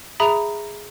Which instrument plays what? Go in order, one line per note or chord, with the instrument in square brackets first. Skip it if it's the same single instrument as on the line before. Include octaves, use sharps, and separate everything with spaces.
[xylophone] G#4 E5 A#5 B5 D#6 F7